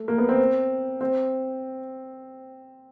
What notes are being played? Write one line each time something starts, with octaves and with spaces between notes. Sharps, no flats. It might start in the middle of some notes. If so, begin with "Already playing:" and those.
Already playing: A3
A#3
B3
C4
C4